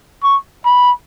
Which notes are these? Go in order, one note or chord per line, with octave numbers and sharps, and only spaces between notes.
C#6
B5